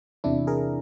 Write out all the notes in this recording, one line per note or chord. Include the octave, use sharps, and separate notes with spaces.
E2 C3 E3 D4 E4
G#4 A#4